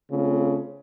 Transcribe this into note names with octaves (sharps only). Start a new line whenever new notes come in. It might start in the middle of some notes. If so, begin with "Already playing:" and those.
C#3 A3 C4 F4